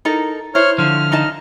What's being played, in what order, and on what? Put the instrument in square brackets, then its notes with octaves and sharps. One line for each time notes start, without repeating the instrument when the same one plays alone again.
[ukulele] D#4 A4 A#4
[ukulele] E4 C5 [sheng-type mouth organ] C#5 F6
[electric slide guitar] D3 F3 [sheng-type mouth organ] F6
[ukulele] D#4 D#5 A5